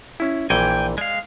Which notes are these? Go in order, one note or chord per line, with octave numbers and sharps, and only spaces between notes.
C#4 E4
A#1 A#2 E3 G5 G#5
G#3 D5 F5